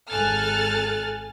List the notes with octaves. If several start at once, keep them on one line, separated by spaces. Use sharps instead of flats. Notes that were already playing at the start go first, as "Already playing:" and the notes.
G#1 A4 G#5 F6 F#6 A6